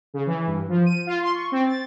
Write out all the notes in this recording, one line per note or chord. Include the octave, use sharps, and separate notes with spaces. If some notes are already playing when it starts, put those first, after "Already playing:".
C#3
E3
G2
F3
D#7
F4
C6
C#6
C4
A6